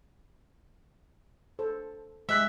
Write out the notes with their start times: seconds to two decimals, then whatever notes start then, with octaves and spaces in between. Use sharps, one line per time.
1.59 A4 C5
2.29 G#3 G4 D#5 E5 E6 F#6 B6